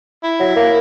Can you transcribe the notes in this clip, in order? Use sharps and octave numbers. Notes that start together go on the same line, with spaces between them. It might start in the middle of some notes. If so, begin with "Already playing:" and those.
E4
F#3
A#3